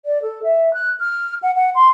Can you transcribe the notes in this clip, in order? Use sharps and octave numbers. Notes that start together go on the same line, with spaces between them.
D5
A4
E5
F#6
F6
F#5
F#5
C6